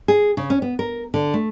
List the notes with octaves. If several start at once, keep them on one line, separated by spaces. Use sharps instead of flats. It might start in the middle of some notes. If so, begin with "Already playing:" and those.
G#4
C#3
C#4
B3
A#4
D3
A3